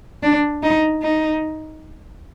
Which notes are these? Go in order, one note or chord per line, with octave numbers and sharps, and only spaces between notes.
D4
D#4
D#4